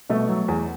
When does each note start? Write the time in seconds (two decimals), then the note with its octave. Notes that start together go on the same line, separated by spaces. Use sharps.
0.10 B2 A3
0.29 F#3
0.48 E2